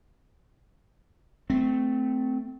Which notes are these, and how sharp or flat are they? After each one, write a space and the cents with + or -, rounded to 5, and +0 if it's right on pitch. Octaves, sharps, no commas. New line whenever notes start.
A3 +0 C4 -20